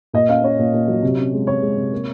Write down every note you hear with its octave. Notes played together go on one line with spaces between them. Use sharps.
A#2 D#5
C#4 F5
C#4 C#5
A#2
A#2
F#3
C3
C#4
G#3
C3 C#5
G#3
C3
A#3